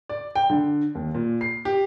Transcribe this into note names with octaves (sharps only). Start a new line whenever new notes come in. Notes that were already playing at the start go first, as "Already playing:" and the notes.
D5
G5
D3
D#2
A#2
C7
G4